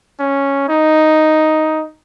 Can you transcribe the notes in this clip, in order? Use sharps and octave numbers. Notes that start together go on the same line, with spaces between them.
C#4
D#4